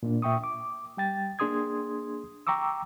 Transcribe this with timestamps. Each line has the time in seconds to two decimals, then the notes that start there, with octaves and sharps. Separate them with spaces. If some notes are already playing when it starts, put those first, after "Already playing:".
0.03 A#2 A#3 D4
0.22 A#2 E5 G5 C#6 D#6
0.44 D6
0.97 G3 G5 A6
1.39 A#3 D4 G#4 C6 D#6 G#6
2.47 G5 A#5 C#6 D6 E6